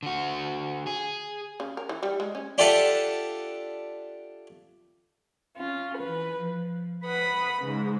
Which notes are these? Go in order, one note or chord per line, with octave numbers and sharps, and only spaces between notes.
D3 F#4
G#4
C#3
A#4
E3
G3
G#3
C#4
D4 F4 G4 A4 E5 F#5
C#4 F4
E3 B4
F3
B4 F#5 B5 D#6
G#2 C#3 G#3